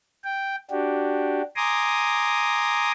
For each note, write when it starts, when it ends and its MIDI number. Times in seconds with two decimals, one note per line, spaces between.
0.24 0.56 79
0.71 1.42 62
0.71 1.42 66
0.71 1.42 67
1.56 2.92 80
1.56 2.92 82
1.56 2.92 84
1.56 2.92 86
1.56 2.92 87